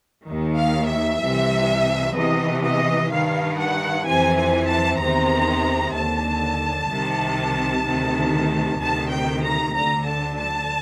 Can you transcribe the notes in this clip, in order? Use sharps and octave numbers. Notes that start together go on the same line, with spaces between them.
D#3
D#2
F5
E5
C2 C3 E3
E2 C3 E3 D#5
D#5
G2 D#3 F5
F#5
F2 C3 E3 G#5
G#5
A5
E2 C3 D#3 A#5
D#2 D3 A5
C2 C3 D#3
D2 C3 D#3
D2 C3 D#3 A5
G5
A#5
D2 D3 A#5
A5
A5